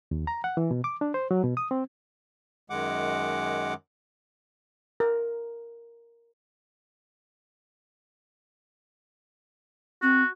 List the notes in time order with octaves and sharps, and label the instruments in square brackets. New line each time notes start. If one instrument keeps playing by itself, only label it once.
[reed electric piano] D#2
A#5
F#5
E3
B2
D6
D4
C5
F#3
B2
D#6
C4
[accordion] F#2 D#3 G#3 F#5 D6
[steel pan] A#4
[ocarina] C4 [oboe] F#4